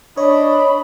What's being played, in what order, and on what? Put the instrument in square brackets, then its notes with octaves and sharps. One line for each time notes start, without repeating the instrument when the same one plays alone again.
[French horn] D4 [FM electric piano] C#5 [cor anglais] D#5 [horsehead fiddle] B5